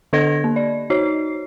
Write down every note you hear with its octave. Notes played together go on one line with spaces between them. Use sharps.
D3 D4 A4 D#5 G#6 A#6
A#3
D5
D#4 F#4 C#5 C7